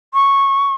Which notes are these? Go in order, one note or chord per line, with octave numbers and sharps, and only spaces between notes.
C#6